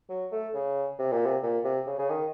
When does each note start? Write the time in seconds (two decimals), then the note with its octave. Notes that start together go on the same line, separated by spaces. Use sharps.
0.09 F#3
0.32 A3
0.54 C#3
0.99 C3
1.12 A#2
1.26 C3
1.43 A#2
1.64 C3
1.87 C#3
1.99 C#3
2.10 D#3